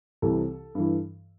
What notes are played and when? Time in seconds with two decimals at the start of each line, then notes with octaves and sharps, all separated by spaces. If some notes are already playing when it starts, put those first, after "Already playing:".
0.22 C2 C3 E3 A4
0.75 G2 E3